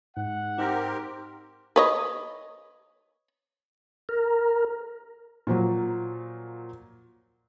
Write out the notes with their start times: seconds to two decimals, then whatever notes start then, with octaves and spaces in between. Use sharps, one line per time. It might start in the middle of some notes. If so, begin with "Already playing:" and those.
0.17 G#2 F#5
0.58 C4 D#4 G4 A#4
1.76 B4 C#5 D#5
4.09 A#4
5.47 A#2 F3 F#3